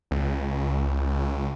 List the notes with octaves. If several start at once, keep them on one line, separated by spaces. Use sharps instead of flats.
C#2